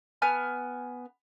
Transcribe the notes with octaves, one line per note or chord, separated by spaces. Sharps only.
B3 G#5 F6